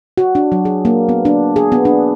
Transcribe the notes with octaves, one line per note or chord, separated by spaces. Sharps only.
F#4
D4
F#3
G#4
A#3
B3
D4
G#4
B3
D4